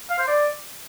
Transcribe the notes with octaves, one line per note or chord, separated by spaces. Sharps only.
F5
C5
D5